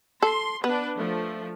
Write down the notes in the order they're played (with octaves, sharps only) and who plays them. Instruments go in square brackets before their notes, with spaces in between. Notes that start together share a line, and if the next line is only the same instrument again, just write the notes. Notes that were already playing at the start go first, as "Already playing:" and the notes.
[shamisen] A4 [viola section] C6
[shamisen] B3 [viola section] D4 B4
[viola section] F3 A3